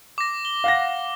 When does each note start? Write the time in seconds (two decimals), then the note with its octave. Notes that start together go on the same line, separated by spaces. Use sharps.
0.18 D6 A#6
0.45 G7
0.64 F5 F#5 A#6